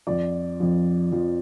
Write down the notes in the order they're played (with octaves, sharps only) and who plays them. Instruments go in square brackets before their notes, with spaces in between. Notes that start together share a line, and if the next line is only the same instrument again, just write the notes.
[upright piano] F2 F3 D5
F2 F3
F2 F3